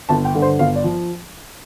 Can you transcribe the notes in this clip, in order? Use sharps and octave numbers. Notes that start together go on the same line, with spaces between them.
G1 A5
G5
G2 D3
C5
G1 F5
D5
F3